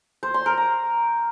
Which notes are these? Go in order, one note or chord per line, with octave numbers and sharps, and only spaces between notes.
C5
C6
A#4
A#5